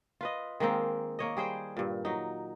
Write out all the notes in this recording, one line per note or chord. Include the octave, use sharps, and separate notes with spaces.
F4 B4 D#5
D#3 G#3 A#3 C4
A#3 C#5 D#5
G3 G#4 C5 G5
G2 A#2
F#3 D#4